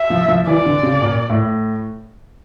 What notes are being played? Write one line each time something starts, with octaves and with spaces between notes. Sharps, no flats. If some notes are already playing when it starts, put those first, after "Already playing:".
Already playing: E5
F3
F3
E3 D5
D3
C#3
A#2
A2